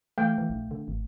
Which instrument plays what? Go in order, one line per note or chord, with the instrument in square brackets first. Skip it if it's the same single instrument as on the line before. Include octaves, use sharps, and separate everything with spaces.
[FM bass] E3 [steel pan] A3 F5 G5
[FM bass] E3
A#1
D3
G#1